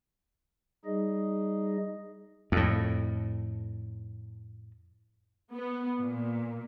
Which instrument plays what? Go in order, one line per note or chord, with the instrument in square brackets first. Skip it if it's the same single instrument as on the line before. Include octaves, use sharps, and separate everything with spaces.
[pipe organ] G3 D#4 G#4 D#5
[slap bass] F2 A2
[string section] B3
A#2